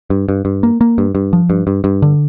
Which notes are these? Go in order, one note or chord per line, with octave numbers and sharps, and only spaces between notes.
G2
G2
G2
A#3
A#3
G2
G2
F3
G2
G2
G2
D3